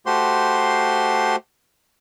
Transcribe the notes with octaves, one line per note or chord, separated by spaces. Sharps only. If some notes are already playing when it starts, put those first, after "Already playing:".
A3 F#4 G4 C5 C6